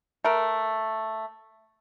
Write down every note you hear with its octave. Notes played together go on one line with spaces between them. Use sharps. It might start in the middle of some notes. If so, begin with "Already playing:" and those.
A3 A#4